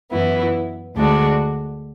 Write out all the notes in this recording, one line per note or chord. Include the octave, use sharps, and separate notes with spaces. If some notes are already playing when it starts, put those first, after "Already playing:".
F#2 E3 B3 E4
D2 D3 G#3 D4 F#4